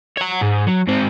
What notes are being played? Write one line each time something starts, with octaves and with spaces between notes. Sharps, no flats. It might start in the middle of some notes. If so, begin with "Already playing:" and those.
C#5 F#5
G#2
F#3
G#2 C4